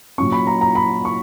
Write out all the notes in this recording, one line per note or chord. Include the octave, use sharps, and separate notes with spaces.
A#2 F#3 C#4 C#6
B5
A#5
A#5
B5
C#6